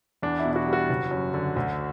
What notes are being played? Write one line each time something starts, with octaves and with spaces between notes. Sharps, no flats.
E2 D4
E4
B2
E4
F#4
G3
F#4
F#1
F#2
D3
D2